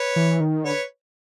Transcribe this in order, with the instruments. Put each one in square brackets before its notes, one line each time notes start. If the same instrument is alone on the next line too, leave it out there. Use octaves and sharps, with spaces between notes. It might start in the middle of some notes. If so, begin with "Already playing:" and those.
Already playing: [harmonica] B4 C#5
[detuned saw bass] E3
D#3
[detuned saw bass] D3 [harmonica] B4 C#5